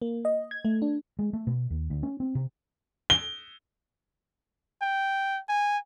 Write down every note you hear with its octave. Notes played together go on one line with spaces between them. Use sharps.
A#3
D#5
G#6
A3
D4
G#3
A3
B2
D#2
D2
C#4
C4
C3
G7
G5
G#5